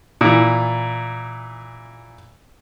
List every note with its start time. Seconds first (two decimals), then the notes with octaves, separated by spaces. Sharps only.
0.21 A#2 E3